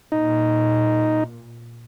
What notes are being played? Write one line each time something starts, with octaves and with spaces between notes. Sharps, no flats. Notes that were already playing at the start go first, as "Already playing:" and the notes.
A#2 D#4